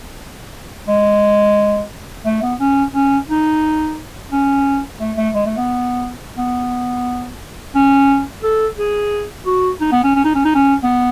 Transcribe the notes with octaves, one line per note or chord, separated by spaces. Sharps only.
G#3
A3
B3
C#4
C#4
D#4
C#4
A3
A3
G#3
A3
B3
B3
C#4
A4
G#4
F#4
D#4
B3
C#4
C#4
D#4
C#4
D#4
C#4
B3